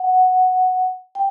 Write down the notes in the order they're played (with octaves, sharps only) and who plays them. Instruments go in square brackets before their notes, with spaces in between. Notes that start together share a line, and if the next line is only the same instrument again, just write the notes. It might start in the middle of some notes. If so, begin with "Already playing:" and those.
Already playing: [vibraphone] F#5
G5